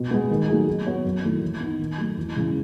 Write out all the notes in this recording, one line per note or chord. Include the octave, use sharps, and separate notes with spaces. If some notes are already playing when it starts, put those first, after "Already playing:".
Already playing: B2
G#3 B3
D#3
F#3 A3 D#4 G#4
F#3
B3 F#4 C#5
F#2
D#3 A3 E4
E3
B3 D#4
D#3
F#3 A3
E2
C#3 E3 G#3